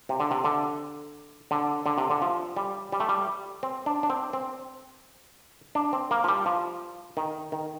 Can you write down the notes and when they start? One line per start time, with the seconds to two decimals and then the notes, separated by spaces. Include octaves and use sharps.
0.09 C3
0.20 D3
0.31 C3
0.44 D3
1.51 D3
1.86 D3
1.98 C3
2.10 D3
2.22 F3
2.56 G3
2.92 G3
3.00 A3
3.09 G3
3.63 C4
3.86 D4
4.03 D4
4.10 C4
4.33 C4
5.75 D4
5.93 C4
6.11 A#3
6.24 F3
6.28 G3
6.46 F3
7.17 D#3
7.52 D#3